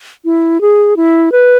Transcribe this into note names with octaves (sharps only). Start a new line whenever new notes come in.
E4
G#4
E4
B4